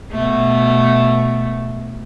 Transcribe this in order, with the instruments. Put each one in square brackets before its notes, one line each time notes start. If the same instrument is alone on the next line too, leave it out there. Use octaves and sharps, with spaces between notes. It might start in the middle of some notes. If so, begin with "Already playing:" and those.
[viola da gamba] B2 A3